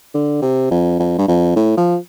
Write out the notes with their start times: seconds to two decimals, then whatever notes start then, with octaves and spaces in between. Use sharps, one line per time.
0.14 D3
0.42 C3
0.71 F2
0.99 F2
1.18 G2
1.28 F2
1.56 A2
1.77 F3